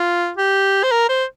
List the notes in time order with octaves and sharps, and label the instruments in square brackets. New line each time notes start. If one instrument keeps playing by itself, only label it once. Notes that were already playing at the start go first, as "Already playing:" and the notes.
Already playing: [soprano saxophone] F4
G4
C5
A#4
C5